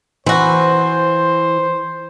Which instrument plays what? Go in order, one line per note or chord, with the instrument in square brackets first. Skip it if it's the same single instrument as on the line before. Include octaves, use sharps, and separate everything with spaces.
[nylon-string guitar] E3 [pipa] C4 F#4 [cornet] C5